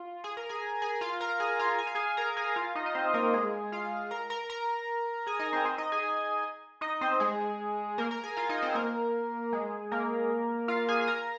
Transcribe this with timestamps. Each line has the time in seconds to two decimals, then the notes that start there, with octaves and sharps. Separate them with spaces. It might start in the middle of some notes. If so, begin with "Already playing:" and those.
Already playing: F4
0.24 G#4 G#5
0.37 A#4 A#5
0.49 G#4 G#5
0.82 G#4 G#5
1.01 F4 F5
1.21 A#4 A#5
1.40 G#4 G#5
1.59 F4 F5
1.78 G#5
1.87 F5
1.95 G#4 G#5
2.17 A#4 A#5
2.37 G#4 G#5
2.56 F4 F5
2.75 D#4 D#5
2.86 D#5
2.94 C4 C5
3.14 A#3 A#4
3.34 G#3 G#4
3.72 F4 F5
4.11 A#4 A#5
4.30 A#4 A#5
4.50 A#4 A#5
5.27 G#4 G#5
5.39 D#4 D#5
5.53 C4 C5
5.65 C4 C5
5.78 D#4 D#5
5.92 G#4 G#5
6.81 D#4 D#5
7.01 C4 C5
7.20 G#3 G#4
7.98 A#3 A#4
8.11 A#4 A#5
8.23 G#4 G#5
8.37 F4 F5
8.49 D#4 D#5
8.62 C4 C5
8.75 A#3 A#4
9.53 G#3 G#4
9.92 A#3 A#4
10.68 F4 F5
10.88 G#4 G#5
11.01 G#5
11.07 A#4 A#5